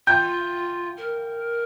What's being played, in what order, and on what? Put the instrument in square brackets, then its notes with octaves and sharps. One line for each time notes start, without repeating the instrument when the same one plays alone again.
[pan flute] F4 [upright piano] G5 G6
[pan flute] A#4